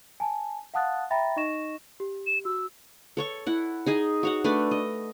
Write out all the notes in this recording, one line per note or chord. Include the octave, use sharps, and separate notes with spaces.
G#5 A5
F5 F#5 A5 D#6 F#6 A6
E5 G5 A#5 B5 A6 A#6
D#4 D#5 C#6 A#6 E7
G4
E7
F#4 E6
A4 C#5 C#6
E4 F#5
D#4 G#4 D#5 G#5
F#4 C#5 F#5
A3 D4 B4 D5
D#5